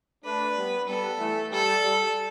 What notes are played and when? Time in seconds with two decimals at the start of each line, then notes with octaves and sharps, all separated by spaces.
0.24 A3 D4 B4
0.56 G3 B3
0.88 G3 B3 A4
1.19 E3 A3
1.51 G3 A4
1.83 G3